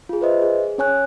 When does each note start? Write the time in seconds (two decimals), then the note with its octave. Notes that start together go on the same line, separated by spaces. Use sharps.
0.09 F4 G#4
0.21 B4 C5 D#5 E5
0.42 G#4
0.78 C#4 C#5 G#5 F#6